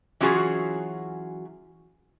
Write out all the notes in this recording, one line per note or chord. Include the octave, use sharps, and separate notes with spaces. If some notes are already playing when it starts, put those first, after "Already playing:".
E3 F#3 C#4 F4 F#4 G#4